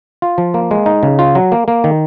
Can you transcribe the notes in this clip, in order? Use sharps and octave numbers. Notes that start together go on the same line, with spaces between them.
F4
F3
A#3
G#3
D#4
C#3
F4
F#3
A#3
A#3
D#3